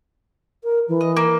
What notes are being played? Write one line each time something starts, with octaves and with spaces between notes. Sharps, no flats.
A#4
E3
D#5
A#3